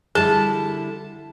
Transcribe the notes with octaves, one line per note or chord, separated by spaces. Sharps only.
D3 G3 E4 G#4 A5